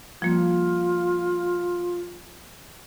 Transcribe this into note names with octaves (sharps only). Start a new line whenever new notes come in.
F3 G3 A#3 F4